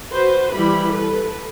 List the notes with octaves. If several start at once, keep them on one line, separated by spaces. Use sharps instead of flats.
F#4 B4 C5
E3 G3 E4 B5
A4 B4